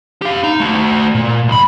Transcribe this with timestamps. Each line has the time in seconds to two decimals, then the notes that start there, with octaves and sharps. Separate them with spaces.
0.22 G4 F5
0.44 D#4
0.60 A3 F#4
1.15 A#2
1.48 B1 B5